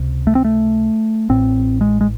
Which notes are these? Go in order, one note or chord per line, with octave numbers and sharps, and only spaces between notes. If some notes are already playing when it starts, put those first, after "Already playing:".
Already playing: C#2 C3
A3
C4
A3
A1 A2 C4
G#3
G#3